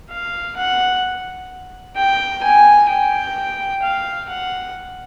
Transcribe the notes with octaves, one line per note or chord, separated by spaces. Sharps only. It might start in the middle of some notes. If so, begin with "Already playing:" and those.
F5
F#5
G5
G#5
G5
F5
F#5